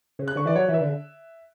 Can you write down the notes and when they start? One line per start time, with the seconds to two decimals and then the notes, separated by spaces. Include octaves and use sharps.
0.19 C#3
0.28 F#6
0.36 D3 C#6
0.46 E3 D5
0.56 F#3 C#5
0.69 E3
0.74 E5
0.80 D3